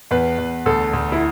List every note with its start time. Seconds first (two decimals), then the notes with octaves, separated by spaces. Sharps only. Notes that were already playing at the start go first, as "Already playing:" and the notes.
0.11 E2 B4
0.38 E2
0.66 D2 A4
0.93 D2
1.12 E4